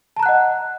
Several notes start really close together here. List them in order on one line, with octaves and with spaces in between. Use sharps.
A5 A#5 F#6 F#5 D#5